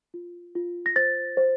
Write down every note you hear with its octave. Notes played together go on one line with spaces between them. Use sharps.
F4
F4
A#6
C5 A6
C5